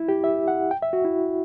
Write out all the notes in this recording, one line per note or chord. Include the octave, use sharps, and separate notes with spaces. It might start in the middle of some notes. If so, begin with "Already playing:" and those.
Already playing: E4
G4
E5
F#5
G5
E5
F#4
E4